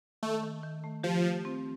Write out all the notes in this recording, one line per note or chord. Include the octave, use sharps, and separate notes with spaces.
D#3 A3
D#3
D#3
A3
F3 G4
A3
C4